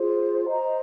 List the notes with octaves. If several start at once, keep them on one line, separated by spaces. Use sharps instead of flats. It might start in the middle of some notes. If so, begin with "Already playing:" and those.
Already playing: F4 G#4 C5
C5 D#5 A#5